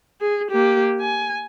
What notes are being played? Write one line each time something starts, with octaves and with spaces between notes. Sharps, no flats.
G#4
A#3 G4
G#5